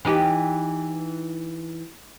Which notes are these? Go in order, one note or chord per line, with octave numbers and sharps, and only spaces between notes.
E3 D#4 G4